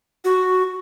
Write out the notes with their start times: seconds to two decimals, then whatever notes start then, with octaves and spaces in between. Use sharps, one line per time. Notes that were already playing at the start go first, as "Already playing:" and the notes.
0.25 F#4